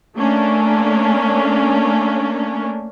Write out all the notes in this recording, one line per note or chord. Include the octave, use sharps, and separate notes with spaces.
A3 A#3 C#4 D4